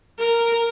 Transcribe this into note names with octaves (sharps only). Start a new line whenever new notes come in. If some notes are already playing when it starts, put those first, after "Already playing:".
A#4